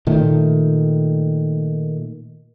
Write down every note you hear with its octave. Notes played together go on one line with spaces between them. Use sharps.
A#2 D#3 A3